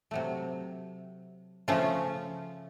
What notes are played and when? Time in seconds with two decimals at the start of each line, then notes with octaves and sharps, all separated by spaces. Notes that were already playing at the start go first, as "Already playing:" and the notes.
0.11 C3 F#3 A3
1.68 C#3 F3 A3 C#4 F4